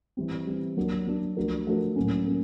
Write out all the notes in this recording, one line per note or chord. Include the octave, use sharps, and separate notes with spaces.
E3 G3 C4
E3 G3 C4
F#3 A#3 D4
F#3 A#3 D4
F3 A3 D4 F#4 A#4
F3 A3 D4 F#4 A#4
A2 F#3 A#3 C#4
A#3 C#4